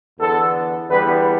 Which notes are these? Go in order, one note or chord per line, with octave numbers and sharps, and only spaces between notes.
E2 D3 B3 A4
E2 D3 G3 B3 B4